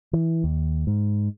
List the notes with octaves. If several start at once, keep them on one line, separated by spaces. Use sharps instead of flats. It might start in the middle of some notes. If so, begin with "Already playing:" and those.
E3
D#2
G#2